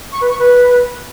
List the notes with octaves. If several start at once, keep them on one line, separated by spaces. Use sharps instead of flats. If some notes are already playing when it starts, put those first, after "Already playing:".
C#6
B4
C#6
B4